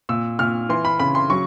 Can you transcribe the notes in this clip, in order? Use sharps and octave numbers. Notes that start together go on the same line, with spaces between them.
A#2 E6
A#2 F6
E3 C6
B5
C#3 B5
C6
F#3 C#6